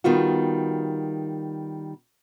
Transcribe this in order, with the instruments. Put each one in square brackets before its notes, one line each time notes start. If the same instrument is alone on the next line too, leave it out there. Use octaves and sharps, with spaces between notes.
[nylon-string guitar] D#3 G3 B3 F4 F#4